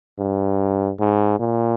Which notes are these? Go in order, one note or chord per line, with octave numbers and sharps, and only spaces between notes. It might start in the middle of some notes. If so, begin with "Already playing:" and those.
G2
G#2
A#2